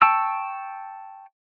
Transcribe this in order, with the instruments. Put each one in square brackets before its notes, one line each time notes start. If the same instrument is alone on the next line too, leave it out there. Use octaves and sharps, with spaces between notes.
[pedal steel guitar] G5 A5 C#6 E6